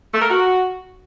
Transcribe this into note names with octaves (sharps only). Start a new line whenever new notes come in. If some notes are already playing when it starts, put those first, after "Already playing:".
A3
A#4
F#4